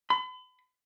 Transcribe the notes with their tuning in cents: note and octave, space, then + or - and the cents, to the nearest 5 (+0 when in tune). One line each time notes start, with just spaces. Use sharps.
B5 +40